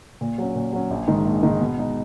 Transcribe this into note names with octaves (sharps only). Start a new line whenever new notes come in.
A#2
F#3 C#4
A#2
F#3 C#4
A#1
G#2 D#3
A#1
G#2 D#3
B2
G#3 D#4